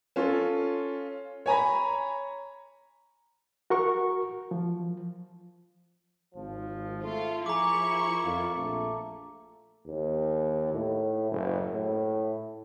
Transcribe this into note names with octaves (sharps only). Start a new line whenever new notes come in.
C#4 F4 A4
C#5 G#5 A#5 B5
F#4 A#4 C#6
F3
G#1 F3
A3 F4
F3 E4 G#4 A#4 A#5 C#6 D6
F2 F4
A#1 A3
D#2
A2
F#1
A2